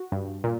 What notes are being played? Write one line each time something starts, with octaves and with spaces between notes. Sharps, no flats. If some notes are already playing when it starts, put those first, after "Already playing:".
Already playing: F#4
G2
A#2